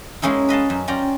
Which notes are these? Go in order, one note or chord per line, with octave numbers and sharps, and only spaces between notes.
G#3 A#3 C#4 D#4 E4
B4 D#5 F5 A5
F#2
C#4 F4 D5 G5 A#5